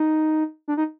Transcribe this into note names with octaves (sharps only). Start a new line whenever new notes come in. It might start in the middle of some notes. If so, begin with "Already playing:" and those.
Already playing: D#4
D4
D#4